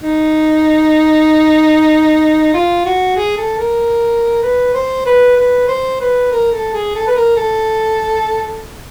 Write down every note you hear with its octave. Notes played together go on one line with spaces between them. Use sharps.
D#4
F4
F#4
G#4
A4
A#4
B4
C5
B4
B4
C5
B4
A#4
A4
G#4
A4
B4
A#4
A4